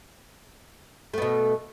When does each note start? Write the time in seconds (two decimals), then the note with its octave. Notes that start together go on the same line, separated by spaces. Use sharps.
1.14 A3
1.18 B3
1.22 B2